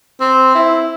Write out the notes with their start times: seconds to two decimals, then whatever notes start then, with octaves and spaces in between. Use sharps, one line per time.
0.21 C4
0.55 E4